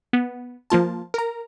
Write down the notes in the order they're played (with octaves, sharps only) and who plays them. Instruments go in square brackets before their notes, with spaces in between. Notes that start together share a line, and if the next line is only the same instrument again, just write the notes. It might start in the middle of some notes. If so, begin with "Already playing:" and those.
[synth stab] B3
F3 A#3 F4 A5
A#4 A#5